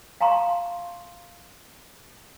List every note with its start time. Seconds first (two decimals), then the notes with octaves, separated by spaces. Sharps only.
0.21 F5 A5 A#5 C6 C#6